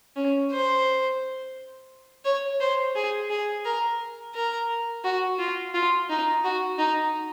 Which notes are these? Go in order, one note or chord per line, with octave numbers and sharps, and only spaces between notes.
C#4
C5
C#5
C5
G#4
G#4
A#4
A#4
F#4
F4
F4
D#4
F#4
D#4